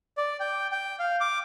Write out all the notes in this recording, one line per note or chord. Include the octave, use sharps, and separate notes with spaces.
D5
G5
G5
F5
D6